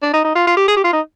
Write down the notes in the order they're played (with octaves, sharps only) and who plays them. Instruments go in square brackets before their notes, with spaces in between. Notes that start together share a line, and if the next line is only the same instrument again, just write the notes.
[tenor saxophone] D4
D#4
D#4
F4
F4
G4
G#4
G4
F4
D#4